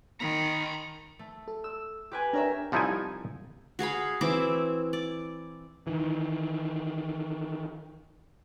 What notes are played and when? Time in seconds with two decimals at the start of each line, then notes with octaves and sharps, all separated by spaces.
0.20 D#3 A#5 B5 C#7
1.19 A3
1.48 A4
1.64 E6
2.11 G4 B4 G#5
2.33 D4 A#4 C#5 E5
2.72 C2 F3 D#4 E4 A4 G#5
3.79 F#4 G#4 F5 B5
4.21 E3 C4 E4 D6
4.93 D5
5.87 D#3 E3